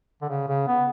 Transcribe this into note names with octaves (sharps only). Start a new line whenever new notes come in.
D3
C#3
C#3
B3